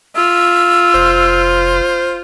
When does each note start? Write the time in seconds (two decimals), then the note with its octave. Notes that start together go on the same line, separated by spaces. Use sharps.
0.16 F4 E6
0.94 F1 C5